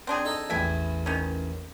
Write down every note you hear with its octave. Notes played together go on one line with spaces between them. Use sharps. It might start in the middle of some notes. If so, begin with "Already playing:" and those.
C4 D4 G#4
D#4 A4 A#5
A1 E2 E5 G5 G#5
D#3 C#4